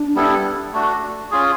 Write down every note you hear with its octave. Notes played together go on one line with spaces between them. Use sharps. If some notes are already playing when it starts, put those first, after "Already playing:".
Already playing: D4
G3 B3 E4 A4
A3 D4 F#4
C#4 F4 G#4